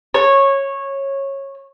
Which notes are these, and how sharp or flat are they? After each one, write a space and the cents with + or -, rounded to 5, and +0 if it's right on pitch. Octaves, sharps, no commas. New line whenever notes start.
C#5 -15